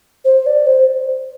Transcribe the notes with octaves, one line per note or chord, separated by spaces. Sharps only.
C5
D5
C5